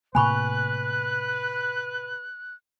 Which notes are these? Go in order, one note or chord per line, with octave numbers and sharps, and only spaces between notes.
A2 C3 A#3 B4 G#5 B5 C#6 F#6